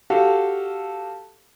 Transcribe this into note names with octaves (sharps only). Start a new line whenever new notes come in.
F#4 G4 A4 F5